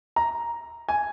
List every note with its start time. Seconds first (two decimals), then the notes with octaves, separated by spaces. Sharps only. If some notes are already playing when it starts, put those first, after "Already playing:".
0.16 A#5
0.88 G#5